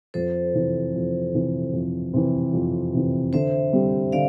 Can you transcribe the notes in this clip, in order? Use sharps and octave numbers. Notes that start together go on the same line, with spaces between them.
F2 A4 C5
C3 E3
F2
C3 E3
F2
C3 E3
F2
C3 E3
D3 C5 E5
G3 C4 G4
D3 D5 F5